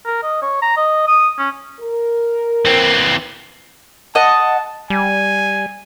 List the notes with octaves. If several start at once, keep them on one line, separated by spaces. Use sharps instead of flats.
A#4
D#5
C#5
A#5
D#5
D#6
C#4
A#4
E3 C4
D#5 F#5 A5
G3 G#5